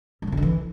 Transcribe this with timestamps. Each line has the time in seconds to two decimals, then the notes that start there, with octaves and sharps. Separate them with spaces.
0.22 G3
0.27 D3
0.32 C3
0.37 D3
0.42 E3